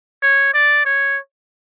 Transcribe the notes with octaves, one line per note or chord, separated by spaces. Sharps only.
C#5
D5
C#5